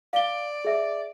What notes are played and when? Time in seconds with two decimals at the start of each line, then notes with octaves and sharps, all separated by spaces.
0.13 D5 F5 G7
0.65 G#4 E5